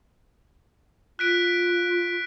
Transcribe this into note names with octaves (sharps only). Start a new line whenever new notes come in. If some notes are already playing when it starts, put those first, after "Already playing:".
F4 F#6 B6 D7